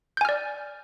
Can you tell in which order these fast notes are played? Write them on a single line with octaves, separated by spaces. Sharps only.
G6 G#5 F6 D5